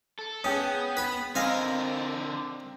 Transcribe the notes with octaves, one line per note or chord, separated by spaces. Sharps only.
A4
B3 C#4 G#4 G5 D#6
B4 B5
D3 C4 A#4 D#5 F5 G#5